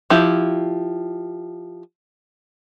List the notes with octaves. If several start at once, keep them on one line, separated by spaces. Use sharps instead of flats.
F3 E4 G4